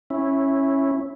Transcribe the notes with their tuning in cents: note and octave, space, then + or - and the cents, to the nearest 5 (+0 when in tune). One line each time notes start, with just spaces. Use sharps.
C#4 -15 E4 -5